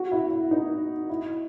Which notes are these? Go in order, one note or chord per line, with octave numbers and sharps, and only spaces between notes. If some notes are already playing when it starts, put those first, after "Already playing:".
Already playing: F#4
E4
E4
D#4
E4